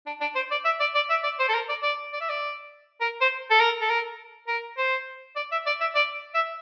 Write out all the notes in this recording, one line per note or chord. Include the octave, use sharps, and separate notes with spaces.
D4
D4
C5
D5
E5
D5
D5
E5
D5
C5
A4
A#4
D5
D5
D5
E5
D5
A#4
C5
A4
A#4
A4
A#4
A#4
C5
D5
E5
D5
E5
D5
E5